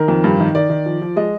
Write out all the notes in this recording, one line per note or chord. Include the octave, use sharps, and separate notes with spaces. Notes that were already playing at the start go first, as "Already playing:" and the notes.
Already playing: D#3 A#4
F2
G2
D#3
D#3 D5
D#3
F3
F3
G#3 D#5